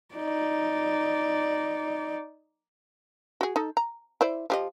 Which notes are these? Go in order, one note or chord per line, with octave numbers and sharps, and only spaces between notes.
D#4 D5
F#4 G#4
D#4 A4
A#5
E4 C5 D5
F3 G4 D#5